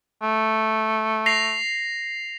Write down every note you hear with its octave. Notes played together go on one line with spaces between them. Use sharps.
A3
A#6 C7 F7